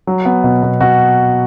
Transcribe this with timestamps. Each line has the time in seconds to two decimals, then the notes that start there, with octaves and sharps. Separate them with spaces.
0.07 F#3
0.25 B3
0.44 B2
0.63 B2
0.81 B2 F#4